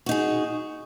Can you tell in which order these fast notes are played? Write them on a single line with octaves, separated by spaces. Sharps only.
F#4 D#4 G#4